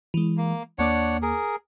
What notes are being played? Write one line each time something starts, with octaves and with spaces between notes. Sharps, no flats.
E3 G#3
A#3
D#2 A#3 D4 C#5 F#5 D6
G#4 A#4